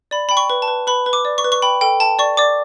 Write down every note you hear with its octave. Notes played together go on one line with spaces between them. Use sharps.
D5 B5
G5 B5
C#6
B4
A5
B4
B4 B5
B4
D6
D5
C#6
B4
C#6
G5 B5
A4 G5
G5 A5
D5 C#6
D5 D6